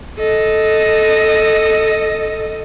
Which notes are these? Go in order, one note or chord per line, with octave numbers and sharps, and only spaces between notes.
A4 D#5